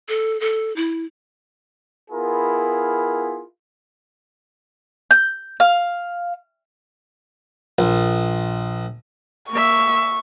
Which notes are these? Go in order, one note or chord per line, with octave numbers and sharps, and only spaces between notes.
A4
A4
E4
B3 E4 F4 G#4 A#4
G6
F5
A#1
A#3 E5 C#6